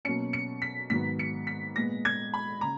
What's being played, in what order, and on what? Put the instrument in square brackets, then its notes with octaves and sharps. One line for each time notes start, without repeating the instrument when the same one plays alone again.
[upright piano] B2 F#3 A#3 C#4 C#7
C#7
B6
G#2 D#3 F#3 B3 B6
C#7
B6
A#2 G#3 B3 A#6
G#6
B5
C#3 A#5